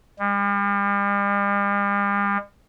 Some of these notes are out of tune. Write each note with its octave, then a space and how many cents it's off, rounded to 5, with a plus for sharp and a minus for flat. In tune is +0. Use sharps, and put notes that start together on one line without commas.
G3 +45